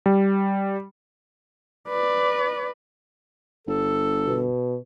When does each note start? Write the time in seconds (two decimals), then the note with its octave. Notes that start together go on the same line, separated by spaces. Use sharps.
0.06 G3
1.88 B4 D5
3.67 G1 A4
4.27 B2